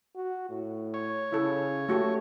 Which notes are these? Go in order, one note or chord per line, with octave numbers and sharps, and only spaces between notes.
F#4
A2
C#5
C#3 E4 A4
A3 F#4 G4 A4